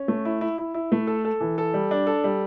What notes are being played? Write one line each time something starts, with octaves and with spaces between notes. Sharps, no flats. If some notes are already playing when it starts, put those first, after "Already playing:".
Already playing: C#4
A3
E4
E4
E4
E4
A3
A4
A4
E3
A4
G3
D4
A4
G3